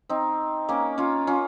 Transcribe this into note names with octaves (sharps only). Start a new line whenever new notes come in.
C4 D#4
A#3 C#4
C#4 F4
C#4 F4